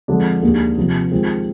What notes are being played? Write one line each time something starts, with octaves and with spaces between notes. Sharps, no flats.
F2 D3 F3 G#3 D4
D#2 D#3 A#3 D4 G#4
C3 F3 C4 G4
D#3 G#3 C4 F4 G#4